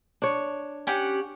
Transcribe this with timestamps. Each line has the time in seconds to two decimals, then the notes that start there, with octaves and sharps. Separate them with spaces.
0.22 D4 C#5
0.87 C#4 G4 F#5